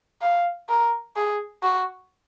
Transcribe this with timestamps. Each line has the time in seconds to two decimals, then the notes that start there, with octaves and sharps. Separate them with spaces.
0.22 F5
0.69 A#4
1.16 G#4
1.63 F#4